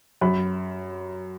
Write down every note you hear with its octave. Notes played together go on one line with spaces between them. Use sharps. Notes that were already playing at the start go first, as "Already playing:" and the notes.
F#2 B5